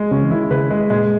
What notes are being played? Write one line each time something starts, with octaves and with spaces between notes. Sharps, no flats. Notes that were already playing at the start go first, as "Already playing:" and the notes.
Already playing: G#3
C#3 C#4
E3
D#3 E4
C#3 B4
G#3
A#2 G#3